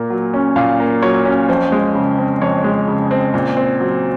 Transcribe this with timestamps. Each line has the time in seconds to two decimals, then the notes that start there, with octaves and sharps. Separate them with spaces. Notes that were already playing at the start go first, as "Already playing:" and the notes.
Already playing: A#2 A#3
0.10 F#3
0.34 C#4
0.56 A#2 F5
0.80 A#3
1.02 F#3 C#5
1.25 C#4
1.49 F2 C5
1.72 G#3
1.95 C#3
2.18 C4
2.42 F2 C#5
2.64 G#3
2.88 C#3
3.11 C4
3.34 A#2
3.57 C4
3.80 F#3